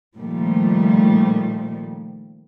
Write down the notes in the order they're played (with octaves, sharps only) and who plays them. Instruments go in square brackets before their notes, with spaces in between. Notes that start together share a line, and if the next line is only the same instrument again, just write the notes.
[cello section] A#2 D#3 F3 G3 A3